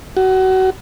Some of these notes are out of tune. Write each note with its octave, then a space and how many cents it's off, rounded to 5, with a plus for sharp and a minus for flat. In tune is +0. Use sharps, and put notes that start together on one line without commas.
F#4 +25